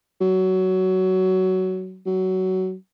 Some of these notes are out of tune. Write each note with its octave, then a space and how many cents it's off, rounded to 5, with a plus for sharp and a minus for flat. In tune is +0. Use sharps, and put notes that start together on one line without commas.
F#3 +15
F#3 +15